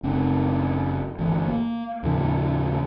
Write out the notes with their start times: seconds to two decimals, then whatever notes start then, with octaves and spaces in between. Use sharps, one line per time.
0.03 F#1 C4
1.18 G1 E3
1.47 A#3
2.03 D#2 A2 C#3 F3